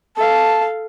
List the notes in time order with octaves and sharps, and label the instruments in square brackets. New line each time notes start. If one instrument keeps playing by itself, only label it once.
[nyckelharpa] A4 F5 [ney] A5